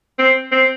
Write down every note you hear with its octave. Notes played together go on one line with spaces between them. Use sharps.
C4
C4